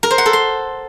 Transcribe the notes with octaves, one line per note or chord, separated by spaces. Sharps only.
A#4
C5
F#5
A4
C6